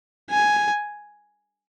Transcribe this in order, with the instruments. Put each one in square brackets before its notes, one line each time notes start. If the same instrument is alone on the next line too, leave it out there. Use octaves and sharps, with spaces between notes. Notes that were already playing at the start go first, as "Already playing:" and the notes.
[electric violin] G#5